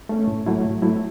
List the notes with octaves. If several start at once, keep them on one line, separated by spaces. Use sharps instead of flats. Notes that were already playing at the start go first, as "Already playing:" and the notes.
A3 C#4
A2
F#3 A3 E4
A2
F#3 A3 E4